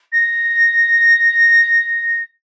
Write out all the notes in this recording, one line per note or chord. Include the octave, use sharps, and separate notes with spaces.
A#6